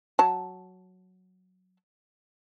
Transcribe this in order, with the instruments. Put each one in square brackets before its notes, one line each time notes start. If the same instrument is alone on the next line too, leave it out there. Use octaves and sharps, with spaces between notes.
[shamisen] F#3 A5